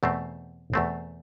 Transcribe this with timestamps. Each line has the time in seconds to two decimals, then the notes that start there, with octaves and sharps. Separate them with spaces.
0.03 E2 B2 A3 C4
0.74 E2 B2 A3 C4